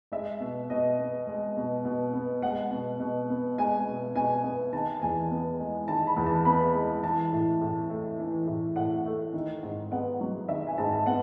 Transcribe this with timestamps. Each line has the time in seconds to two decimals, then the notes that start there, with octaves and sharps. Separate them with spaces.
0.12 G#3 E5
0.40 B2
0.70 B2 D#5
0.98 B3
1.27 G#3
1.57 B2
1.85 B2
2.13 B3
2.42 G#3 F#5
2.71 B2
3.00 B2
3.30 B3
3.58 G#3 G#5
3.87 B2
4.15 B2 G#5
4.44 B3
4.72 D#3 A5
5.02 E2 G#5
5.31 B3
5.60 G#3
5.88 D#3 A5
6.07 B5
6.16 E2
6.26 A5
6.45 B3 B5
6.75 G#3
7.03 E3 A5
7.32 A2
7.61 A2
7.89 A3
8.19 E3
8.47 A2
8.76 A2 F#5
9.06 A3
9.33 D#3
9.63 G#2
9.91 B3 F#5
10.21 F#3
10.49 D#3 E5
10.67 G#5
10.78 G#2 A5
10.92 A5
11.06 B3 F#5